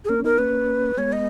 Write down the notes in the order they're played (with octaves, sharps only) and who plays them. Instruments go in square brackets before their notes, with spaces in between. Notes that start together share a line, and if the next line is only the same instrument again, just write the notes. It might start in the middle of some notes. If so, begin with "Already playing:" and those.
[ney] G#4
[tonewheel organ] A#3 C#4 [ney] A#4
[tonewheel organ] C#4
[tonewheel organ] B3 D#4 [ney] A#4
[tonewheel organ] A#3 C#4 [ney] B4
[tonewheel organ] G#3 B3 [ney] C#5
[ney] D#5